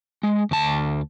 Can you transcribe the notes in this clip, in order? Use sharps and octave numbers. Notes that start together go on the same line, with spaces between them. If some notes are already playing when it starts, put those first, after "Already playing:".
G#3
D2 A5